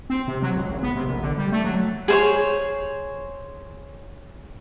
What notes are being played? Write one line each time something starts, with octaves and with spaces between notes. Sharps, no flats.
C4
C3
F#3
C#2
G#1
B3
C3
A#1
D3
G3
A3
F#3
G#4 C5 C#5